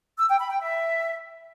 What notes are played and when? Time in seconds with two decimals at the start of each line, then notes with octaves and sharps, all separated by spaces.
0.18 E6
0.29 G5
0.40 B5
0.50 G5
0.61 E5